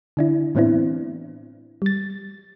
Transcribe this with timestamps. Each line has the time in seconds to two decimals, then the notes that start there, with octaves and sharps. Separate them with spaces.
0.17 D3 D4 E4
0.55 A2 E3 B3 C4 D4 E4
1.82 G3 A6